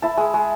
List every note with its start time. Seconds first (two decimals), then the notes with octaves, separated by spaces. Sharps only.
0.02 E4 A5
0.17 G#3
0.34 G#3